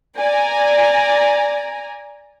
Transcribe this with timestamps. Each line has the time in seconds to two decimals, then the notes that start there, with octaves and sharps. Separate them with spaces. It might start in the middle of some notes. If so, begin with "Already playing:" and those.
0.18 D5 G#5 A#5